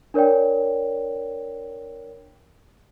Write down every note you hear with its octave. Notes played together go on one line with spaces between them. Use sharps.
D4 A#4 C#5 D5 G5